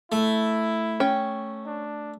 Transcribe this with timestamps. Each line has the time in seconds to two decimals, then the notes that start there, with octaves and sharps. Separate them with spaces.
0.12 A3 E4
1.00 C#4 G5
1.66 D4